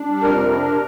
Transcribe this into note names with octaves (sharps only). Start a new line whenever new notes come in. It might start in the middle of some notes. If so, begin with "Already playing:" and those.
Already playing: D4
G3
F2 A#4
C3
D4
C3